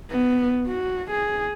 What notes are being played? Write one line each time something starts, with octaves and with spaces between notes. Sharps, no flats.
B3
F#4
G#4